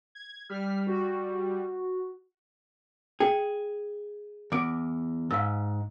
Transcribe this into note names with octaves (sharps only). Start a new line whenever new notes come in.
G#6
G3 F6 B6
F#4
G#4 G5
E2 D6 D7
G#2 F5 E6